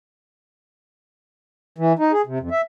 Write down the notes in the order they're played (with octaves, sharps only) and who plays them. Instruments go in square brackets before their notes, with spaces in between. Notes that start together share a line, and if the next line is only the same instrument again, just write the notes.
[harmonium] E3
D#4
G#4
C3
F2
E5